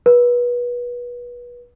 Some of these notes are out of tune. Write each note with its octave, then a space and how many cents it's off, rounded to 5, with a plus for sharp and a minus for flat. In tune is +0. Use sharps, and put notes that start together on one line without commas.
B4 -30